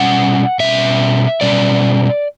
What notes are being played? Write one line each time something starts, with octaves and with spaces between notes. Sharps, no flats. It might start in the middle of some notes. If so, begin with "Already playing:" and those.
Already playing: B2 G3 C#4 F#5
B2 G3 C#4 E5
B2 G3 C#4 D5